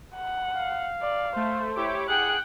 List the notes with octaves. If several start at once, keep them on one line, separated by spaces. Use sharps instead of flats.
F#5
F5
D5
A3 C5
E4 G4 C#5 D6
G#4 F#5 G5 F#6